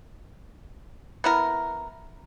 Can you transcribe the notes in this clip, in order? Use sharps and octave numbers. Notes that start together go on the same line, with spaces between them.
B3 E4 A#4